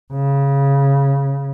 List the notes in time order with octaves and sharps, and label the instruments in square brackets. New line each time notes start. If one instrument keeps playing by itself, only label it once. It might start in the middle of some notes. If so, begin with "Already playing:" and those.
[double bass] C#3